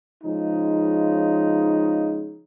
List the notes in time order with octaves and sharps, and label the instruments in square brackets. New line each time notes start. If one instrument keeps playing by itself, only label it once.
[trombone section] C#3 F3 G#3 D#4